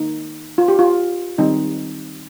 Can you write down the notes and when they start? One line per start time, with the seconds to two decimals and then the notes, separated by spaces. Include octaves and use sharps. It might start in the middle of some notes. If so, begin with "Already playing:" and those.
Already playing: D#3 A#3 D#4
0.58 F4
0.68 G4
0.79 F4
1.38 D#3 G3 C4 D#4